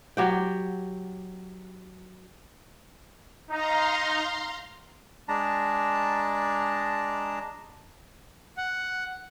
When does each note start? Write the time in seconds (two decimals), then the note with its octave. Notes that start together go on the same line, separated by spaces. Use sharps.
0.17 F#3 G4 G5
3.50 D#4 F5 A#5 C6
5.28 G#3 D4 A5 A#5
8.57 F#5